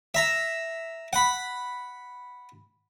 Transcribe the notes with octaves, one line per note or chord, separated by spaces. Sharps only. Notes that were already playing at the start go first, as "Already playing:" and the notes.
E5 A#5
F#5 B5